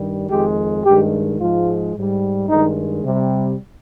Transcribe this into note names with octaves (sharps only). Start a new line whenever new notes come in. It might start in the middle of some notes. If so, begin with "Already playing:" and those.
Already playing: G2 D#3 G3
F2 D#3 G#3 G4
G2 D#3 G#3 G4
G#2 F3 G#3 F4
G#2 G3
G2 D#3 G#3 D#4
C3 G3